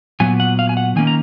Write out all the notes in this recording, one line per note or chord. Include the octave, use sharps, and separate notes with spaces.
A#2 F#3 B3 G#5
F#5
F5
G#5
F#5
D#3 A#3 C#4 G#5
A#5